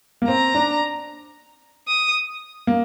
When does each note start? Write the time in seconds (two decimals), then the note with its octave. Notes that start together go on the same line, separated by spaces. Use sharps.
0.22 A#3
0.28 C4 A#5
0.55 D4
1.88 D#6
2.67 A#3